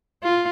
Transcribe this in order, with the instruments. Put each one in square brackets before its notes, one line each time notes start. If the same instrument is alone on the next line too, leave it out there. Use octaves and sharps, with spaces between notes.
[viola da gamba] F4